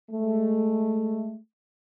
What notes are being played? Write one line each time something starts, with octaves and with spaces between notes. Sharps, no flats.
G#3 A3